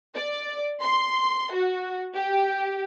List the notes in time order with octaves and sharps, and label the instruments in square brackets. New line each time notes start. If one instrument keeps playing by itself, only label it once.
[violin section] D5
C6
F#4
G4